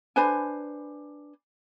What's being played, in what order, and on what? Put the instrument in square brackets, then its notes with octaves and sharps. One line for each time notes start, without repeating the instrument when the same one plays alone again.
[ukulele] D4 B4 C5 G#5